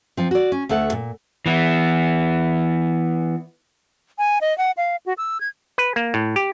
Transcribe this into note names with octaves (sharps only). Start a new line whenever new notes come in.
F3 C4
F#4 D5
C#4
D2 A3 A4 F#5
A#2
E3 B3
G#5
D#5
F#5
F5
F#4
E6
G#6
B4
A#3
A2
G4